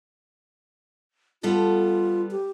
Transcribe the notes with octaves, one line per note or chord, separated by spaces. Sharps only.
G3 B3 F4 A4
G4